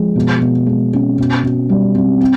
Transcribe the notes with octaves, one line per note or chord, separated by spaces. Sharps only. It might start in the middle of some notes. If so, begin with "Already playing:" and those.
Already playing: F3 G#3
B2
B2
G#3
C#4
B2
B2
G3
C4
C4